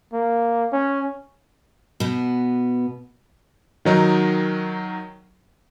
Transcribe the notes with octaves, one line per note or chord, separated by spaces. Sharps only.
A#3
C#4
B2 B3
D#3 F#3 D#4 A#4